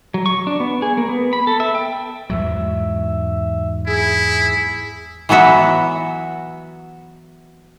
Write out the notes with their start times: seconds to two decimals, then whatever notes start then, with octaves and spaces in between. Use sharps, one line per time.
0.14 F#3
0.26 C#6
0.47 D4
0.60 B3
0.82 G#4
0.97 A#3
1.09 B3
1.33 B5
1.47 A4
1.60 E5
1.75 G5
2.30 E2 G#2 F#3 E5
3.87 E4 G#4
5.29 E3 F#3 B3 F#4 E5